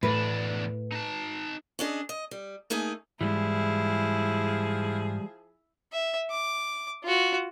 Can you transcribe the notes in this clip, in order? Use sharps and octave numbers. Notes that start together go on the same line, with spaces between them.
E2 A2 D4 B4
D#4 A5
C#4 D4 G#4 D#5
D#5
G3
A3 A#3 D#4 G#4 G#5
G#2 E3 F3 G3 G#3 E4 G#4
E5
D6
F4 F#4